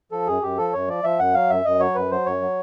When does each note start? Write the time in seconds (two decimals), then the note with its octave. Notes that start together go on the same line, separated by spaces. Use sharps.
0.12 F3 A4
0.27 F#2 G#4
0.42 F#2 G4
0.58 F3 A4
0.73 F#2 C#5
0.88 F3 D5
1.04 F3 E5
1.19 F#2 F#5
1.35 F#3 F5
1.50 F#2 E5
1.65 F#2 D#5
1.80 F#3 C#5
1.95 F#2 B4
2.11 F#3 C5
2.26 F#2 C#5
2.42 F#3